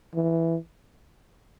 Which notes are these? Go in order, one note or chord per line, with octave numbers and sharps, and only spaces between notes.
E3